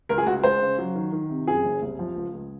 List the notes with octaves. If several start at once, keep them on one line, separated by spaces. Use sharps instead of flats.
C#2 A#4
G#4
C#2 F#4
G#3 C5
C#3
F#3
D#3
D#3
C3
F#2 G#4
F#1
C2
F3
C#2
C#2